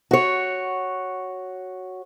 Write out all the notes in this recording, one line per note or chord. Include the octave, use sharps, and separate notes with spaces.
F#4 C#5